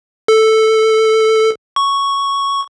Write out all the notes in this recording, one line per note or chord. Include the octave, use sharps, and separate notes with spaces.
A4
C#6